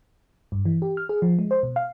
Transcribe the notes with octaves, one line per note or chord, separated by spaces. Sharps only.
G2
E3
G4
F6
G#4
F3
G#3
C5
B2
F5